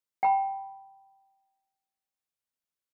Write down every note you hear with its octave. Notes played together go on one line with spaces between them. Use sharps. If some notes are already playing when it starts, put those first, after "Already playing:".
G5 B5